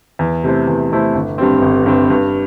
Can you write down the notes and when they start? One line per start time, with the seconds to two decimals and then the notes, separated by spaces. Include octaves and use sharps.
0.19 E2
0.44 C3 A3 E4 C5
0.68 E2
0.92 C3 A3 E4 C5
1.15 G1
1.38 G2 G3 C4
1.62 G1
1.86 G2 G3 C4
2.10 G2